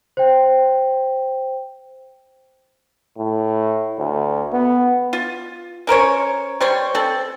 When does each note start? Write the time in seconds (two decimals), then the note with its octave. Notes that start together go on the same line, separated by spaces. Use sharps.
0.17 C5 G5
3.18 A2
3.99 D2
4.53 B3
5.13 F4
5.87 C#4 A#4 C5 C#5
6.61 G3 C5 C#5
6.95 C4 A4